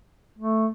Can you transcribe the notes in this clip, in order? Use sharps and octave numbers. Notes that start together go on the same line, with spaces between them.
A3